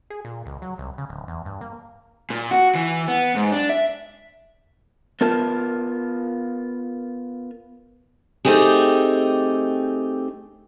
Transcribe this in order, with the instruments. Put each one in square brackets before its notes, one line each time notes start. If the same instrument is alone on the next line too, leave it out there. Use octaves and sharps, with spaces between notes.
[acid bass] G#4
A#2
C#2
F#3
C2
C#3
D1
E2
G2
A#3
[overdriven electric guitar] A#2
F#4
E3
B3
G#2
D4
E5
[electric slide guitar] B3 F4 A#4 A5
[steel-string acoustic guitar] A3 C4 D#4 G4 G#4